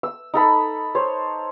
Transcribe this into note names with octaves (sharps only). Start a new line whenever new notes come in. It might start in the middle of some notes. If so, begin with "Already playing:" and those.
E6
D#4 A4 B5
C5 C#5